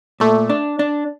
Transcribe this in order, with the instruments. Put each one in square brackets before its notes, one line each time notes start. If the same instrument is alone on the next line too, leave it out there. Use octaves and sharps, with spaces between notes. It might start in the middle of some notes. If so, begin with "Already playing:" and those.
[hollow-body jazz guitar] A#2 [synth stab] A3
[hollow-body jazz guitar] D4
D4